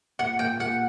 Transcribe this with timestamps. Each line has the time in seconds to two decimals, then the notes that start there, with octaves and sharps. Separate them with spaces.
0.19 A#2 F#5
0.39 A#2 G5
0.59 A#2 F#5